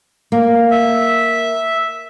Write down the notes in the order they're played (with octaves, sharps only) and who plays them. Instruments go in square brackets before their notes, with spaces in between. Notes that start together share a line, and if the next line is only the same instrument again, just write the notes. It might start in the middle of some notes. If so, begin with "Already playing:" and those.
[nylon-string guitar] A#3
[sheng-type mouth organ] E5